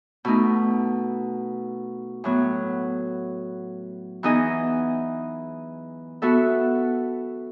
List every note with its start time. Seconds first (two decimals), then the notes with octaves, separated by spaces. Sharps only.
0.25 B2 A3 D#4
2.24 A2 F#3 B3
4.23 E3 B3 D#4 G#4 D#5
6.22 B3 F#4 A4 E5